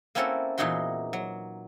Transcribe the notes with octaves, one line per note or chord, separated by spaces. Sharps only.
A#3 C4 C#4 E4 F#4 A4
E2 A#2 D#4 E4 F#4 C6
F#3